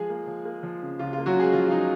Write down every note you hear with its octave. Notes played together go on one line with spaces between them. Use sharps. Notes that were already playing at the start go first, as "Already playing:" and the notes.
Already playing: F3 G#3 G#4
A#3
F3
A#3
F3
C#3
C#2 F4
F4
A#3
F#3 F#4
C#3 G#3 G#4
F3 F4
F4
F3 D#4